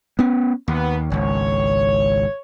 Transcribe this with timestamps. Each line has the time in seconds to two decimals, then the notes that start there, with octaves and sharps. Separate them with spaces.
0.19 B3 C#4
0.68 D#2 B3
1.12 G#1 C#2 C#5